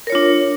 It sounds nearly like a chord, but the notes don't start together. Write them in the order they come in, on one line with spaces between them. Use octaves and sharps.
A#4 C#5 F4 D4